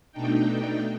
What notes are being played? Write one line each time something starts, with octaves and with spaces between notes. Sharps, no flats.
B2 A3 D4 D#4 G5